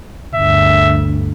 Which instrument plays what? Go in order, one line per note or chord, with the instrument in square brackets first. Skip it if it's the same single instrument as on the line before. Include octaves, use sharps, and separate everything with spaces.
[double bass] G1 D2 [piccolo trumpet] E5